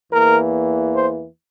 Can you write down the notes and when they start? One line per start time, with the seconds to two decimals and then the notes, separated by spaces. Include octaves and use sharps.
0.12 E2 E3 A#3 A#4
0.94 C5